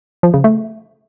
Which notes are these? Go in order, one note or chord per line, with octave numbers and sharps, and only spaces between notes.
F3
C#3
A3